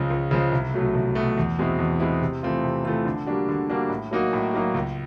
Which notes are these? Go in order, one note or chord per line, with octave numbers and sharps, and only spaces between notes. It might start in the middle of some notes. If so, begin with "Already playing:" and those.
Already playing: C#2 C#3 F3 G#3
C#2
C#3 F3 G#3
C2
B2 F#3 A3
C2
B2 F#3 A3
E2
B2 G#3 C4 E4
E2
B2 G#3 C4 E4
C3
E3 A3 C4 F4
C3
E3 A3 C4 F4
D3
G3 A#3 D4 F#4
D3
G3 A#3 D4 F#4
A2
F#3 A#3 D#4 F#4
A2
F#3 A#3 D#4 F#4
C#2